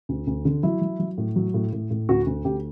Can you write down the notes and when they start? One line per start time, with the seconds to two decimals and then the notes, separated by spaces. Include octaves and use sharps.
0.09 D2
0.27 D2
0.45 D3
0.63 F#3 E4
0.81 F#3
0.99 F#3
1.18 A2
1.36 F#3
1.54 A2
1.73 A2
1.91 A2
2.09 D2 F#4
2.26 D2
2.45 D2 G4